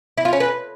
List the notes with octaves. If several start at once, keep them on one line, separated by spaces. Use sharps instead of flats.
E4
F4
C#4
B4